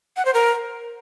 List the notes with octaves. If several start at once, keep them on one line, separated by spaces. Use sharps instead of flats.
F#5
C5
A#4